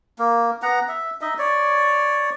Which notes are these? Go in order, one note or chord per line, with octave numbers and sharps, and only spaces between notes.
A#3
B3 F#5 A#5
E5
D#4 D#5 E5
C#5 D5